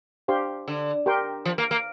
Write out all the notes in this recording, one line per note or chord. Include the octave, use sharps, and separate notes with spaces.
D4 G4 C5 F5 C6
D3
G4 A#4 G5 C6
F3
A#3
A#3